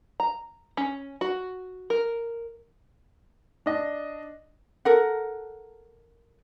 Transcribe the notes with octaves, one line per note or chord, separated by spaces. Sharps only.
A#5
C#4
F#4
A#4
D4 D#5
A4 A#4 F#5